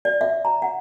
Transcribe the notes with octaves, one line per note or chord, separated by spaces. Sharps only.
D5
E5
A#5
F#5